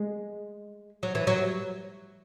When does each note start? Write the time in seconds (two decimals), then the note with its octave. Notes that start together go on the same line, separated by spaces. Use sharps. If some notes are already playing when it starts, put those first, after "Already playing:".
Already playing: G#3
1.03 F#3
1.15 E3
1.27 F#3